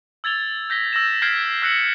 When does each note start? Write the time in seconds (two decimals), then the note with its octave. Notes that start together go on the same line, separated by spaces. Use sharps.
0.24 E6 G#6 A6 F7 G7
0.70 G6 A#6 B6 G7
0.93 E6 A#6 E7
1.22 F6 G6 G#6 B6 C7 D7
1.62 E6 F#6 A#6 C7 C#7 F#7